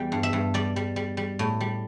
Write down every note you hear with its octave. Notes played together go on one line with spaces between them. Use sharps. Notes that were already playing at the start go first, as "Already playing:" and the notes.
Already playing: E2 G3 G5
G2
E5
G2
G3 D5
G3
G3
G3
A2
G3